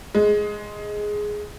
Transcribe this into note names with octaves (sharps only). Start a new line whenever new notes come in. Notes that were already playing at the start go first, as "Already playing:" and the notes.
G#3